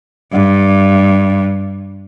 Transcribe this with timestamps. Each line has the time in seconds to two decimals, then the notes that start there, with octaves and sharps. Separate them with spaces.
0.33 G2